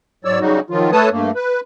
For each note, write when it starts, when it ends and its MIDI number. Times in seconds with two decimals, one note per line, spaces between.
0.25 0.39 44
0.25 0.39 54
0.25 0.39 73
0.25 0.39 74
0.25 0.39 88
0.40 0.60 49
0.40 0.60 54
0.40 0.60 55
0.40 0.60 63
0.40 0.60 66
0.70 0.91 51
0.70 0.91 53
0.70 0.91 54
0.70 0.91 65
0.92 1.09 57
0.92 1.09 69
0.92 1.09 71
0.92 1.09 73
0.92 1.09 81
0.92 1.09 87
1.11 1.31 43
1.11 1.31 57
1.11 1.31 58
1.35 1.60 71